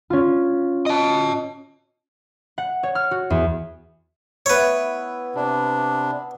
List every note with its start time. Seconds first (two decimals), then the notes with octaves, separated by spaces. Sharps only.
0.10 C#4 F4
0.86 D#5 A5
2.58 F#5
2.83 C#5
2.95 F6
3.11 F#4
3.30 E2
4.46 B3 E4 B4 C#5
5.35 C3 D4 B5